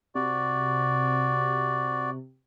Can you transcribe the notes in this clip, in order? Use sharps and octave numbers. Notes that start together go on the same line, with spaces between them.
C3 F#4 D5